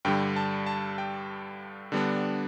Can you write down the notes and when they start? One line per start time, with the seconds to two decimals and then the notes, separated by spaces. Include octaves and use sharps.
0.05 G2 D3 G3 G5
0.36 A5
0.66 A5
0.98 G5
1.92 D3 G3 B3 D4